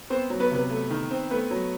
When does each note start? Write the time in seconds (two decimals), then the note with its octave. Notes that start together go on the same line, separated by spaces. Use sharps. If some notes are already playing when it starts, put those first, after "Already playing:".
0.10 B3 C4 C5
0.30 F#3
0.40 B3 B4
0.51 C3 B3 B4
0.70 A3
0.90 D#3
1.11 C4
1.30 A3 B3 B4
1.51 F#3